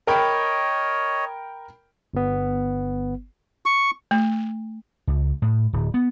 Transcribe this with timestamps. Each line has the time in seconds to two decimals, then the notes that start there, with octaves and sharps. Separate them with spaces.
0.07 A#4 C#5 D#5 G5 B5
2.14 G1 B3
3.66 C#6
4.11 A3
5.07 C#2
5.42 A2
5.73 D1
5.94 B3